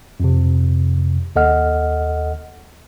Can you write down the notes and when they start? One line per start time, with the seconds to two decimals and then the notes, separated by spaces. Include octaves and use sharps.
0.20 F2 C3
1.36 D#2 A4 D#5 F#5 F6